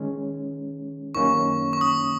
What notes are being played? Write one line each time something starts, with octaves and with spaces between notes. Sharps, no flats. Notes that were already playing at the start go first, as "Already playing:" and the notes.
Already playing: D#3 G#3 C#4
F#2 D#3 A#3 C#4 C#6
C#6
D#6